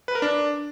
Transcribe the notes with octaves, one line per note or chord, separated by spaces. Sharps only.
B4
A#4
D4